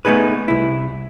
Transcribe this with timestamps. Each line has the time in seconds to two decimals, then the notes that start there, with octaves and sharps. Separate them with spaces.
0.05 A3 B3 D#4 G#4 B4
0.48 C2 E4